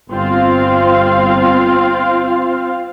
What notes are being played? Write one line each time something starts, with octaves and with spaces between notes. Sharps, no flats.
G1 C4 F4 F5